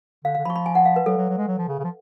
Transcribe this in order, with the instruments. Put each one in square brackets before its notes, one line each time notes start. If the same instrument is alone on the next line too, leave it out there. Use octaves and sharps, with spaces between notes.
[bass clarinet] D3 [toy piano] F5
[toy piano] F5
[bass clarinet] D3
[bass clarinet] F3 [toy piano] B5
[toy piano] C#6
B5
G#5
F#5
F5
B4
[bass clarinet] F#3 [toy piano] A4
[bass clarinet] F#3
F#3
G#3
F#3
F3
C#3
C#3
F3